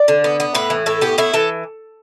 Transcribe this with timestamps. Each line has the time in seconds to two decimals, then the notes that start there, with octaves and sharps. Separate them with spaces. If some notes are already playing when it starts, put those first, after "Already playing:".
Already playing: D5
0.08 D3
0.24 B3
0.40 B3
0.55 A2 B4
0.70 E3
0.86 A2 A4
1.01 B3 G4
1.18 A2 E4
1.33 E3 A4